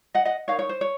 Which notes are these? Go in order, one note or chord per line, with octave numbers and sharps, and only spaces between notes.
D#5 F#5
D#5 F#5
D#4 A#4 C#5 F5
C#5
C5
C#5